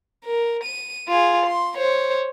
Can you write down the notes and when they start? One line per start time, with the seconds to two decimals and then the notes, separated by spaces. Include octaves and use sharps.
0.25 A#4
0.64 D#7
1.08 F4 G#4
1.46 C6
1.78 C5 C#5